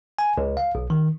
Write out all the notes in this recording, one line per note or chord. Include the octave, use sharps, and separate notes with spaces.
G#5
C#2
F5
B1
D#3